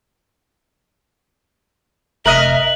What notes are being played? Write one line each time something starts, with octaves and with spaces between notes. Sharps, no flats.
F1 A#4 D#5 E5 F#6 F#7